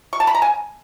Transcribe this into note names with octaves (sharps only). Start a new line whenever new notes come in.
C#6
A5
B5
A#5
G#5